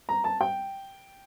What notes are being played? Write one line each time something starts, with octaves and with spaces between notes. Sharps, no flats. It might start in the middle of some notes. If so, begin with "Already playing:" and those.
A#5
A5
G5